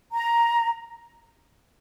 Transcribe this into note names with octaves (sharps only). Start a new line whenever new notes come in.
A#5